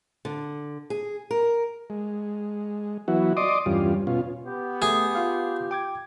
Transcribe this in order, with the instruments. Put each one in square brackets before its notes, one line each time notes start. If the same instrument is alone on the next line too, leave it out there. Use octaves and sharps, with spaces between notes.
[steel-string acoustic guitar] D3
G#4
A#4
[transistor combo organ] G#3
E3 F#3 B3 E4 F#4
D5 D#5 C6 D6 D#6
E2 G2 G3 C#4 F4
B2 C#4 F4
[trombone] B3 [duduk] G4
[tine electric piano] A3 [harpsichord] G#4
[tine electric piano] F4 F5
G5 D6 G#6